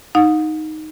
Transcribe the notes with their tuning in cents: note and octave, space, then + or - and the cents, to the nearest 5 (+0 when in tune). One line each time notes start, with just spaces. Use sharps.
D#4 +0 F#5 -45